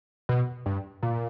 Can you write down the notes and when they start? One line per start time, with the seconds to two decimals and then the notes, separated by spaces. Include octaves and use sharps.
0.29 B2
0.66 G2
1.03 A#2